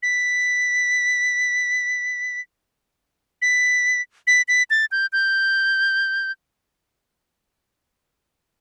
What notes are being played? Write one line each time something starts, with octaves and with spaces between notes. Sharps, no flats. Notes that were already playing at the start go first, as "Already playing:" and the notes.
B6
B6
B6
B6
A6
G6
G6